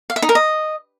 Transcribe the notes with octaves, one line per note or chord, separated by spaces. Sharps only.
F5
E5
D#4
A#4
D#5